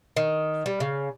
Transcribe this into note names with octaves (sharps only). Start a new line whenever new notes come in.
D#3
G3
C#3